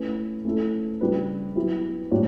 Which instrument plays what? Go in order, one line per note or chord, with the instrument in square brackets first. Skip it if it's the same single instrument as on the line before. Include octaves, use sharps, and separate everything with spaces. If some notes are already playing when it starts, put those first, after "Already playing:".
Already playing: [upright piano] A3 C#4 E4 B4
A3 C#4 E4 A4
C#3 G3 D4 G4 B4
F#3 B3 E4 G4
A2 G3 D4 F#4 C#5